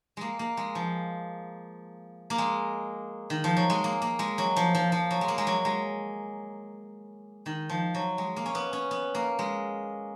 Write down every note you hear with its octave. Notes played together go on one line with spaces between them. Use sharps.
G#3 A#3
A#3
G#3
F3
A#3
G#3
D#3
F3
F#3
G#3
A#3
A#3
G#3
F#3
F3
F3
F3
F#3
G#3
A#3
G#3
F#3
G#3
D#3
F3
F#3
G#3
A#3
C#4
B3
C#4
B3
A#3
G#3